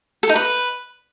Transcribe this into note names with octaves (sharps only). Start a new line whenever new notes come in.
A4
D#4
B4